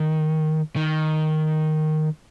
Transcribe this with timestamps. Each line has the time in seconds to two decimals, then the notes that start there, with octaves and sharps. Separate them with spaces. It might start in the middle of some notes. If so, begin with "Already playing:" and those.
Already playing: D#3
0.76 D#3